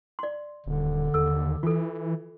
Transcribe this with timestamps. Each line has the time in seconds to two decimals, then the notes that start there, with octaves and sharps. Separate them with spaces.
0.19 D5 C6
0.66 D#1 D3
1.14 D#2 A4 E6
1.63 E3 F4 A4